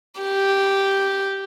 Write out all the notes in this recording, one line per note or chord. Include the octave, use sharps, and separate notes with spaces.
G4